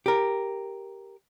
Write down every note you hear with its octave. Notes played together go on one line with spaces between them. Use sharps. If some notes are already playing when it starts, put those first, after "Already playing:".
G4 A#4